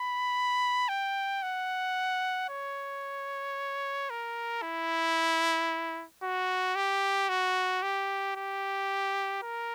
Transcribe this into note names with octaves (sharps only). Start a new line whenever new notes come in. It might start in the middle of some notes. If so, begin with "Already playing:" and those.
Already playing: B5
G5
F#5
C#5
A#4
E4
F#4
G4
F#4
G4
G4
A#4